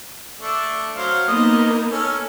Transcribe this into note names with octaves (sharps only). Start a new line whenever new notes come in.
A3 D4
F#3 C5 F5
A#3 B3 D#4 D#5
C#4 A4 A#4